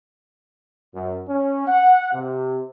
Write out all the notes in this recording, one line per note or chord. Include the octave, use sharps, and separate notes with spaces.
F#2
C#4
F#5
C3